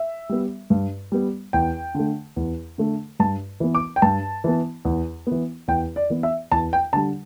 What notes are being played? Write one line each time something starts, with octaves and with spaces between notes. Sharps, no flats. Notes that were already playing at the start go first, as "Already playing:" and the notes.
Already playing: E5
G3 B3
G2
G3 B3
E2 G5
D3 A3
E2
D3 A3
G2 A5
E3 B3
D6
G5
G2 A5
E3 B3
E2
E3 B3
E2 G5
D5
E3 B3
E5
E2 A5
G5
D3 G3 A5